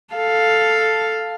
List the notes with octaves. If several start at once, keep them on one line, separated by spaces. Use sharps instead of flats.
A4 F5